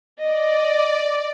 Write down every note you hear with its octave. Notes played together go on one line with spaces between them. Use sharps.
D5 D#5